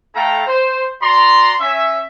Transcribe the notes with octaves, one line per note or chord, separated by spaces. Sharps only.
A3 E4 A4 F5 G5 A#5
C5
F#4 D5 A#5 C6
C#4 E5